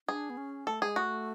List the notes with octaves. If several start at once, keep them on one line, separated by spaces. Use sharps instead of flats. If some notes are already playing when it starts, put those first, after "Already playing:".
D4 G#4
B3
C#4
A3 A4
G#3 G#4
A3 F#4